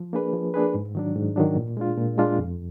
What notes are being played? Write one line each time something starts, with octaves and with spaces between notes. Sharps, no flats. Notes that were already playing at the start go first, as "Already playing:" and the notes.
Already playing: F3
A#3 D4 G#4 B4
F3
A#3 D4 G#4 B4
G#2
D#3 F#3 D4
G#2
D#3 F#3 D4
A#2
G#3 D4 F4
A#2
G#3 D4 F4
F2